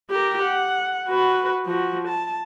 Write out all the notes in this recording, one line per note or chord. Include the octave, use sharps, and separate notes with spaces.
G4 A#4
F#5
F#4 B4
F3 F#4
A5